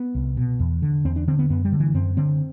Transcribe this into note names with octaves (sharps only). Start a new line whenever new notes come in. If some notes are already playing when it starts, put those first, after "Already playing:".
Already playing: B3
C2
B2
E2
D3
E2 C4
D4
D3 C4
B3
F#2 B3
G3
D3
E3
F#2 C4
D3 C4